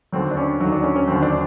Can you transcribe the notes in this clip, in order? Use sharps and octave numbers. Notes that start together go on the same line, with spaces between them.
D#2 D3 F#3 C4
D4
C#4
D#2 D3 F#3 D#4
D4
C#4
C#4
D#2 D3 F#3 C4
D4